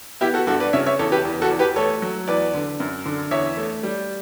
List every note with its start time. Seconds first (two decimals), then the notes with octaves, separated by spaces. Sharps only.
0.21 B3 E4 G4
0.34 F#4 A4
0.47 G2 F#4 A4
0.60 B4 D5
0.73 C#3 C#5 E5
0.86 C#5 E5
0.99 E2 A4 C#5
1.12 G4 B4
1.25 E2
1.42 F#4 A4
1.51 E2
1.59 G4 B4
1.76 A3 A4 C#5
2.02 F#3
2.28 E2 B4 D5
2.54 D3
2.80 F#2
3.05 D3
3.31 E2 C#5 E5
3.57 A3
3.83 G3